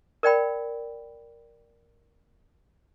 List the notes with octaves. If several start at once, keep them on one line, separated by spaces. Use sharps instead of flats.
A#4 D5 G5 B5